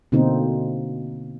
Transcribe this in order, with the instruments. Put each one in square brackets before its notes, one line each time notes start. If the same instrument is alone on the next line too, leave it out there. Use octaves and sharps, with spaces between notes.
[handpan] B2 D3 A#3 C4 D#4